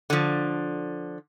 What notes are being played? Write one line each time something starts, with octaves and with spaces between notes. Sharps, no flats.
D3 F3